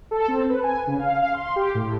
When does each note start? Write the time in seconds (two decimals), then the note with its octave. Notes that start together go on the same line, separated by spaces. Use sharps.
0.11 A4
0.28 C4
0.50 B4
0.63 G#5
0.87 C#3
0.99 F5
1.22 F5
1.34 C6
1.56 G4
1.75 A2